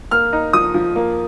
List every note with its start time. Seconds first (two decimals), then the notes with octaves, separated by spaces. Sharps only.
0.11 A#3 F6
0.33 D#4
0.53 F3 D#6
0.74 F3
0.96 A#3